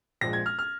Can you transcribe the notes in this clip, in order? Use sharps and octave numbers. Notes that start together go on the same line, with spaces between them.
A#1 A#2 F3 G#3 A#6
G#6
F6
F6